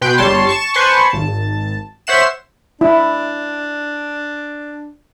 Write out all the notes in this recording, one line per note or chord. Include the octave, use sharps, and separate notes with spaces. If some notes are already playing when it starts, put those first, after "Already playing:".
B2 B4 G5 C6 G6
G1 G3 C#5 A5 C6
A5 C#6 E7
B4 C5 G#5 A5 C6 C#6
G#1 A5
C5 C#5 E5 F#5 C7 E7
D4 E4